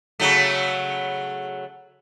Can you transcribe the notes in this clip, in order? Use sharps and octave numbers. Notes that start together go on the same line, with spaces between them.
C#3 F#3 A3